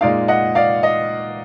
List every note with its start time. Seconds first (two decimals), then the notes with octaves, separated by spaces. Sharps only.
0.01 A#2 G#3 D#4 D5 F5
0.28 D#5 F#5
0.55 D5 F5
0.83 D#5